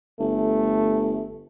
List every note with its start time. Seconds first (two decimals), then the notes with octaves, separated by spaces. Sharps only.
0.20 G1 A3